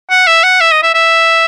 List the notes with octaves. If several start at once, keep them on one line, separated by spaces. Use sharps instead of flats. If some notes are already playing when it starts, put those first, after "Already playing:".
F#5
E5
F#5
E5
D#5
E5
E5